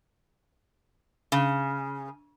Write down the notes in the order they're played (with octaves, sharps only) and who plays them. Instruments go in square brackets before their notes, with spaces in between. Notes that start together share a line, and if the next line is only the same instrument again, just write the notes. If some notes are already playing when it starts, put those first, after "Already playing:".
[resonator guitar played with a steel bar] C#3